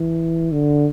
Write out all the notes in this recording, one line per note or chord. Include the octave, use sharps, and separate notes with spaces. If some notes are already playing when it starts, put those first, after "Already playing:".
Already playing: E3
D3